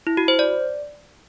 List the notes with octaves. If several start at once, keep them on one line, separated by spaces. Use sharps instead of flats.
E4
F#4
C5
D5